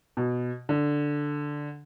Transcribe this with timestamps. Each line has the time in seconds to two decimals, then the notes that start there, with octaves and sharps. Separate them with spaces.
0.17 B2
0.69 D3